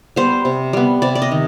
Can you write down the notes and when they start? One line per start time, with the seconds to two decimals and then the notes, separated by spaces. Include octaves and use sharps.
0.16 G3 B3 C5
0.45 C3
0.73 G3 B3
1.02 C3 D5
1.15 D5
1.22 D#5
1.31 D#3